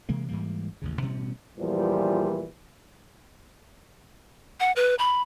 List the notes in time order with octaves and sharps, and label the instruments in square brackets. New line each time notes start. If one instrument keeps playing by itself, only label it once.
[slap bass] C3 E3 G#3 A#3
G#2 E3 G3 A#3
A1 D#2 C#3
A1 B2 G3 C#4
[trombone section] E2 A#2 E3 F3 G3
[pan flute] F#5
B4
B5